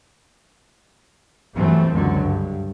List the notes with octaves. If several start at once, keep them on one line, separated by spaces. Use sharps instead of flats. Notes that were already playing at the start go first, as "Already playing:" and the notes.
G2 E3 F#3 A3 C4
C#2 F#2 D3 F#3
G2